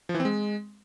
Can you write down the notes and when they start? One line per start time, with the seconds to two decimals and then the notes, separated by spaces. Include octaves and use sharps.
0.09 F3
0.14 E3
0.20 C4
0.25 G#3